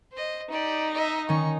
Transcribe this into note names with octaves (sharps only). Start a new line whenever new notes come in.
C5 D#5
D#4 G4 D5
D#5 E5
D#3 C#4 C#6